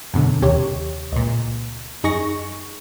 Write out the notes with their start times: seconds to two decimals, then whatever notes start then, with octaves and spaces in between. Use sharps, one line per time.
0.14 F#2 B2 D3
0.42 D#2 C3 G4 C#5
1.12 C#2 A#2
2.04 F#2 D#4 G#4 C#6 A#6